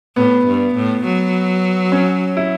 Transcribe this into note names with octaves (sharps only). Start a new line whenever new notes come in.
A2 B3
G2
A2
F#3
C#4
E4